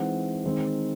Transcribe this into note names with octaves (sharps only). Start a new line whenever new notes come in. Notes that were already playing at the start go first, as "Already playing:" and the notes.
Already playing: E3 G#3 C4 D#4 F#5
D#3 G#3 C4 D#4